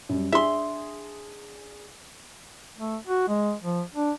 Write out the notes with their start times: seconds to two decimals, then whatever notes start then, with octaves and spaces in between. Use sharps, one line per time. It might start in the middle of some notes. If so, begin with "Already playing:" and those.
0.09 F#2 G3
0.32 D4 G#4 E5 C6
2.78 A3
3.07 F#4
3.28 G#3
3.62 F3
3.95 D4